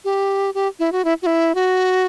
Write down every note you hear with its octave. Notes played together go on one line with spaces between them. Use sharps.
G4
G4
E4
F#4
E4
F#4
E4
F#4